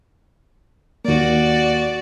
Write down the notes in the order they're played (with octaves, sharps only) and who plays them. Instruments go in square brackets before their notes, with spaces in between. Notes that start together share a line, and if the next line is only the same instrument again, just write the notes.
[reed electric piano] D#2 A#3 [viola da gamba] F#4 D5